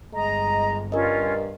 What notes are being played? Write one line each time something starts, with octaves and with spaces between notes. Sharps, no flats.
G1 G#3 D#5 A#5
G2 C#4 F4 A#4 D#5